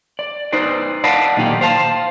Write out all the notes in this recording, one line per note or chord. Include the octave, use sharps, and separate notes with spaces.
D5
D#4 B4 C5 D5
D5 D#5 F5 F#5 A5 B5
B1 A#2 D#3 D#4 G4 D5
C5 F5 A5